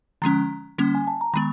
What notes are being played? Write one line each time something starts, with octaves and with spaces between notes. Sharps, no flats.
D3 F3 G#3 C#4 A#5
D3 G3 A#3 C#4
G#5
A5
A#5
D#3 G#3 B3 B5